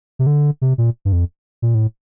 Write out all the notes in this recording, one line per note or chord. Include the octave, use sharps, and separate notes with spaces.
C3
D3
C3
A#2
G2
F2
A#2
A2